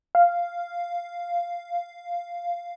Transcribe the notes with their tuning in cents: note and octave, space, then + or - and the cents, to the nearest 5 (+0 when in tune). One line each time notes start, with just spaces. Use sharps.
F5 -5